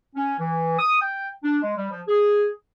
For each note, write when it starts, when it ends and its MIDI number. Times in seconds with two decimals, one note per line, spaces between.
0.16 0.35 61
0.40 0.77 52
0.79 0.96 87
1.01 1.29 79
1.43 1.58 62
1.63 1.74 56
1.76 1.86 55
1.91 2.01 53
2.08 2.48 68